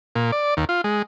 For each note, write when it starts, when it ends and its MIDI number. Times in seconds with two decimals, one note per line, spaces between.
0.15 0.31 46
0.32 0.54 74
0.57 0.65 39
0.69 0.81 65
0.84 1.02 56